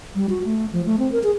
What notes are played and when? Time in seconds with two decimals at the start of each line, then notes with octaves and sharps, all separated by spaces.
0.15 G3
0.29 F#4
0.45 A3
0.73 F3
0.86 A3
0.99 C4
1.12 A#4
1.23 G#4